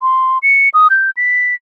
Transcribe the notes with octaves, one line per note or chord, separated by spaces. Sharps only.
C6
C#7
D#6
G6
B6